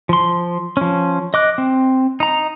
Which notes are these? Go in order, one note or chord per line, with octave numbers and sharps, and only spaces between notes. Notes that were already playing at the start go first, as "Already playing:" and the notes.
F3 C6
F3 C#4
D#5 D6 F#6
C4
D#4 A#5